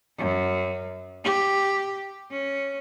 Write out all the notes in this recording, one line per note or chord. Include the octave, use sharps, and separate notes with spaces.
F#2
G4
C#4